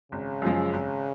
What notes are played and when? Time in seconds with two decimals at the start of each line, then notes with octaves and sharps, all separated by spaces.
0.12 G#1 C#3
0.42 F#2 F3 G#3
0.73 G#1